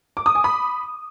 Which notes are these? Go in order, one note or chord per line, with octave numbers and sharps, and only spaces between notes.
D6
D#6
G#5
B5